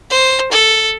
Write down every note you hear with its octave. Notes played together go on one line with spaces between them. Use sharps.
C5
A4